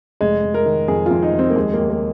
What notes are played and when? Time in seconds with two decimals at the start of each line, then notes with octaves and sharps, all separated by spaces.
0.21 F1 G#3
0.44 F1
0.54 A#4
0.66 D#3
0.88 F2 G#4
1.06 F2 F4
1.23 D#4
1.33 F2
1.39 C4
1.50 A#3
1.55 D#2 G#3
1.73 A#3
1.79 D#2
1.90 A#3